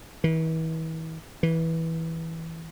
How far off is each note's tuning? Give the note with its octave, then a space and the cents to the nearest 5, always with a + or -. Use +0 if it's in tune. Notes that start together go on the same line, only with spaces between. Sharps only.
E3 -40
E3 -15